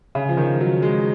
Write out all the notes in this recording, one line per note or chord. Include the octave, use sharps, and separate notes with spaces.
C#3
F3
D#3
F#3
G#3